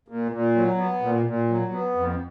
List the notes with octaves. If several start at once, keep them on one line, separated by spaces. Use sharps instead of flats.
A#2
A#2
F#3
B3
A#2
A#2
F#3
B3
F2